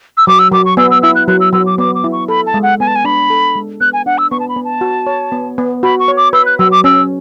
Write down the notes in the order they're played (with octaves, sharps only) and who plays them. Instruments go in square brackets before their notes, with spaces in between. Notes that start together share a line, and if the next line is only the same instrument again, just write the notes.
[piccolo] E6
[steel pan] F#3 [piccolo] D6
[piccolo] E6
[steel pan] F#3 [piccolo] D6
[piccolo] C#6
[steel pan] B3 [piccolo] E6
[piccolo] E6
[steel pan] E4 [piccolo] E6
[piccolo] F#6
[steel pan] F#3 [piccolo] F#6
[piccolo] E6
[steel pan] F#3 [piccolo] E6
[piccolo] D6
[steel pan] B3 [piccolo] D6
[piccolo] D6
[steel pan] E4
[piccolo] C#6
[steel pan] A4 [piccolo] B5
[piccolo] A5
[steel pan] G#3
[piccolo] F#5
[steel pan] B3 [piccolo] G#5
[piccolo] A5
G#5
[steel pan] D4 [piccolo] B5
[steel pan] A4
G#3
[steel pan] B3 [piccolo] F#6
[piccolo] G#5
[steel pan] D4 [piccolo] F#5
[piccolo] E6
[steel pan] B3 [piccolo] C#6
[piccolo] A5
B5
[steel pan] B3
[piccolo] A5
[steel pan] F#4
C#5
B3
B3
[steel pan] F#4 [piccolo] B5
[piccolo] C#6
[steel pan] C#5
[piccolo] D6
[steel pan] B4 [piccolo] E6
[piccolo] F#6
[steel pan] F#3 [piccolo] E6
[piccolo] D6
[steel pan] C#4 [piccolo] E6